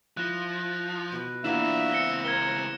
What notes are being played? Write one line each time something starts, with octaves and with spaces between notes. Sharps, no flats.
F3 E4 F#6 A#6
B2 B5
E3 A#3 B3 D4 F4 E5 E7
C#2 C4 C#7 G7
A#4 G#6 G7